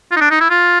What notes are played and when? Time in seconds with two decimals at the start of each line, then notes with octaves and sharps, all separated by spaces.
0.11 F4
0.16 D#4
0.20 D4
0.30 D#4
0.40 E4
0.50 F4